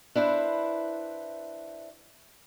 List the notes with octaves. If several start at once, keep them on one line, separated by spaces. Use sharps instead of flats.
D4 E4 B4 C5